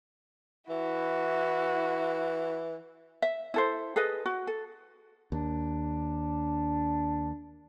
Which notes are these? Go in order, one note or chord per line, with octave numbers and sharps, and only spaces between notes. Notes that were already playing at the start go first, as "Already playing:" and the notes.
E3 E4 F#4
E5
E4 A4 C5
G#4 A4 B4 D#5
F#4
A4
D#2 D4